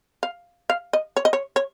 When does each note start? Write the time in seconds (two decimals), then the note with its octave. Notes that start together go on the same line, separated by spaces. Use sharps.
0.23 F5
0.70 F5
0.93 D#5
1.17 C#5
1.25 D#5
1.33 C#5
1.56 C#5